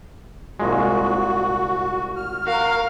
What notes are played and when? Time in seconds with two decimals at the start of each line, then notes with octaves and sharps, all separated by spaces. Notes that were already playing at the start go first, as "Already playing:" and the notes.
0.60 C2 A#2 G#3 F#4
2.16 F6
2.47 F#4 A#4 F5